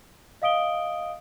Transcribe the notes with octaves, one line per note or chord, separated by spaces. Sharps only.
D#5 F5 D#6 D7 G7